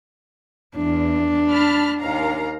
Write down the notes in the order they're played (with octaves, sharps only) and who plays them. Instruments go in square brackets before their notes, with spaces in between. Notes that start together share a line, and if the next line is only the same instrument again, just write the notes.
[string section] E2 [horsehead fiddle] D4
[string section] A5 B5 F6
D#2 F5 A#5